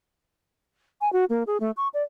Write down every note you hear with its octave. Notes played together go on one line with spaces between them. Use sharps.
G#5
F#4
A#3
G#4
A3
C#6
D5